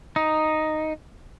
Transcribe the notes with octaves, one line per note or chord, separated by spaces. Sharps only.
D#4